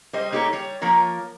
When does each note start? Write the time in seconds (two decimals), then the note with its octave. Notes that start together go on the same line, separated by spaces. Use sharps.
0.13 G3 C5 D#5
0.32 A#3 D#4 G4 A4 C#5
0.53 G3 C#5
0.81 F3 A#3 A#4 C#5